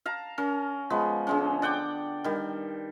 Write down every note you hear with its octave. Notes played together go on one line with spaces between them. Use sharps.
F5 A5 A#5
C#4 A#4
F3 G#3 B3
D3 G#3 C#4
D5 F#5 G5 D6
D#3 G3